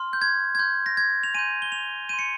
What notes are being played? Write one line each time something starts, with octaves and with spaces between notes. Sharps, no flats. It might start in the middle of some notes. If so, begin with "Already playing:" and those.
Already playing: C6 F6
G6
G#6
G#6
C6 F6 G6
A#6
G#6
F7
G#5 C6 G6 D#7
G7
F7
C6 G6 D#7
C#7